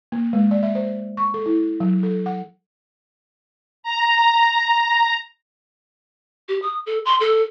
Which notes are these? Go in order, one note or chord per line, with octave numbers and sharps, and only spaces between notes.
A#3
G#3
D5
E5
C5
C#6
A4
E4
F#3
A4
F#5
A#5
G4
D#6
A4
C6
A4